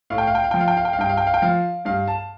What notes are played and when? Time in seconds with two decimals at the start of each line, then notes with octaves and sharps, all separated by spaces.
0.10 A2 F5
0.18 G5
0.27 F5
0.35 G5
0.44 F5
0.51 F3 G5
0.61 F5
0.68 G5
0.77 F5
0.85 G5
0.93 F5
0.98 G2 G5
1.09 F5
1.17 G5
1.27 F5
1.34 G5
1.42 F3 F5
1.85 G2 F5
2.08 A5